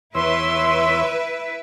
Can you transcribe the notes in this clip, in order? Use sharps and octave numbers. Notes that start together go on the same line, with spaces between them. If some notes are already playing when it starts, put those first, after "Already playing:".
E2 E4 B4 C#5 E5 C6 E6